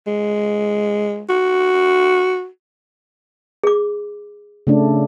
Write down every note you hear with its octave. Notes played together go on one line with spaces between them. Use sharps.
G#3
F#4
G#4 D6
C#3 A3 D4